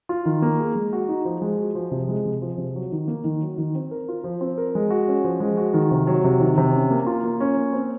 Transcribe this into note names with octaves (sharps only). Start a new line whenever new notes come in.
F4
D#3
A#3
G#4
G#3
F#4
D#4
F3
G#3
F#4
F3
C3
G#3
C3
F3
C3
F#3
D#3
A#3
D#3
F#3
D#3
C4
A#4
F4
F3
C4
A#4
G#3
F#4
C#4
F3
G#3
F#4
D#3
C3
F#3
C3
D#3
C3
C#4
A#3
F4
A#3
C#4
A#3
C4